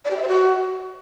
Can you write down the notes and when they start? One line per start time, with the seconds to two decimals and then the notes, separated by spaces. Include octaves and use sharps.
0.05 D5
0.11 G4
0.16 E5
0.22 C5
0.28 F#4